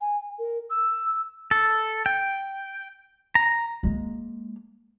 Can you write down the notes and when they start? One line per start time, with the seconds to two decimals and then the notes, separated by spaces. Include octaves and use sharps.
0.01 G#5
0.38 A#4
0.70 E6
1.51 A4
2.06 G5
3.35 A#5
3.83 G#3 A#3